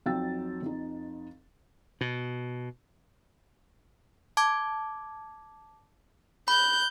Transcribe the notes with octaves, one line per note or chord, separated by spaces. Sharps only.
F2 F#3 D#4 G5 E6 A6
F2 D#4
B2
A5 D6 G#6
B5 F#6 G6